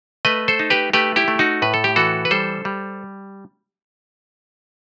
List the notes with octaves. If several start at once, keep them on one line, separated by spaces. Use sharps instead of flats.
A3 B4 D#5
A4 C5
D#4
G4 B4
A3 G4 B4
E4 G4
A3
D#4 F#4
A2 B4
A4
G4
E3 F#4 A4
B4
G3 A4 C5
G3